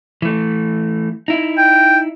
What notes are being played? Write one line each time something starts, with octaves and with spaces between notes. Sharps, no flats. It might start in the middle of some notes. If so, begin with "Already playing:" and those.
E3 A3
D#4 E4
G5